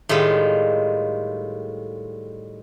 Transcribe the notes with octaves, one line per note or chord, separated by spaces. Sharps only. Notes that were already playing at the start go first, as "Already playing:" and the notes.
A2 D#3 G3 G#3 F4